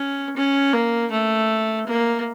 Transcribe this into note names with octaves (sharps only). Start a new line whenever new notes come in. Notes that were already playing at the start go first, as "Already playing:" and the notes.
Already playing: C#4
C#4
A#3
A3
A#3